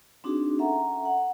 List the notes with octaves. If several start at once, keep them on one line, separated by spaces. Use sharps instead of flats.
C4 D4 D#4 F#4 G#4
C#4 A4 E5 F#5 A#5
F#5